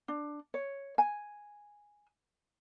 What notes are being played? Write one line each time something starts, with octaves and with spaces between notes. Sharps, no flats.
D4
C#5
G#5